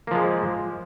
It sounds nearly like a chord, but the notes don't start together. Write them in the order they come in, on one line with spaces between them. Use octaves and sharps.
A#3 F3 G#3